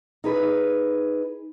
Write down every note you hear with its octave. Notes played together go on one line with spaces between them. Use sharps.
D#4 G#4 B4